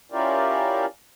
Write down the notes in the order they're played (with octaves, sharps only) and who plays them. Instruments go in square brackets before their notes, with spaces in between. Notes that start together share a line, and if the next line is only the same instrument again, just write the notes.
[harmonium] C#4 E4 F4 G4 A#4 D5